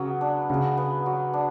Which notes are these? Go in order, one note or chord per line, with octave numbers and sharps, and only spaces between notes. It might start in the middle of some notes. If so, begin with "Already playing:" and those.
Already playing: C#3 F#3 B3
D4
C#3 F#3
B3
F#3
D4